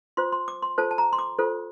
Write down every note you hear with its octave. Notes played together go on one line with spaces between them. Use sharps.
F4 C5 C6
C6
D6
C6
F4 A4 C5 A5
A5
A#5
C6
D6
F4 A4 C5